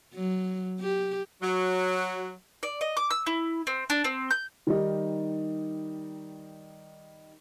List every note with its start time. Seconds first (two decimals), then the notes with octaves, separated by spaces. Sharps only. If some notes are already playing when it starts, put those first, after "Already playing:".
0.14 F#3
0.81 G4
1.42 F#3
2.63 D5
2.81 D#5
2.97 D6
3.11 E6
3.26 E4
3.67 C4
3.90 D4
4.04 C4
4.31 G6
4.67 D#3 G3 D#4